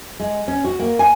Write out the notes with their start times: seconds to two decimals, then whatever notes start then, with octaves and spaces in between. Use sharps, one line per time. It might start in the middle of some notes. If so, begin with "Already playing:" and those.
0.20 G#3
0.48 C#4
0.64 F#4
0.79 A#3
0.99 G#5